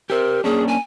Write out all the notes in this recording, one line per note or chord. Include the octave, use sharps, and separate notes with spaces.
G4 A#4 C5
A#3 C#4 D4 G#4
G#5